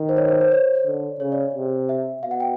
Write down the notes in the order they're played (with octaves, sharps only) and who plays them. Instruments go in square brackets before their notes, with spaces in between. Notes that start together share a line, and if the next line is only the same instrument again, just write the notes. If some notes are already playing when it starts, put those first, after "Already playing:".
Already playing: [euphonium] D#3
[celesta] C5
C#5
C5
C5
C#5
[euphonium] D3
[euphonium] C#3 [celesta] C#5
[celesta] D5
[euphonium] C3
[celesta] E5
[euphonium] B2 [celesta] F5
[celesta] F#5
G5